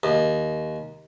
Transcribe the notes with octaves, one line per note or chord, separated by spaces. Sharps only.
D#2